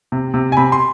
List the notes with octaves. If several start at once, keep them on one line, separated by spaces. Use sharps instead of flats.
C3
C3
G#5
C3 B5
C6